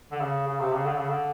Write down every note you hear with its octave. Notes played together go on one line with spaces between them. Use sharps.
D3
C#3
C#3
C3
C#3
D3
C#3
D3